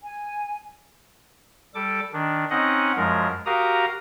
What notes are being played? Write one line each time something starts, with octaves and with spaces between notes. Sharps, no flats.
G#5
G3 A4 D6
D#3 D4
C4 C#4 D#4 D#5 F#5
F#2 F3 G#3 A#4
F#4 G4 A#4 F5 A#5 D#6